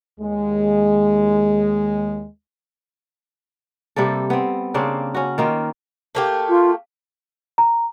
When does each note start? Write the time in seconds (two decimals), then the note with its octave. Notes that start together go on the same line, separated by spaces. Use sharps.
0.20 D#2 G#3
3.96 C3 G3 A#3 A4
4.30 B3 C4
4.74 C#3 A#3 C4 D4
5.14 C#4 F#4
5.38 D#3 A#3 F4
6.15 A3 A#3 G4
6.49 F4
7.58 A#5